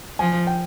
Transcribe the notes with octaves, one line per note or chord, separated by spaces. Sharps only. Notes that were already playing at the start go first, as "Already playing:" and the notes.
F3 G#5
G5